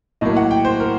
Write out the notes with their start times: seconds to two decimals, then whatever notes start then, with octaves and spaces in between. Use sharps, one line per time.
0.21 A2 F#3 A#3 D#5
0.37 F#5
0.51 G5
0.65 C5
0.80 A#4